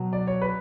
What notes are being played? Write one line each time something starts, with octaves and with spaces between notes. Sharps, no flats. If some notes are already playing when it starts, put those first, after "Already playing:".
Already playing: B2 F#3
D5
C#5
B4